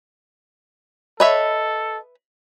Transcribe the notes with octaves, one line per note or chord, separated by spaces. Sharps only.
A4 B4 C#5 D#5 E5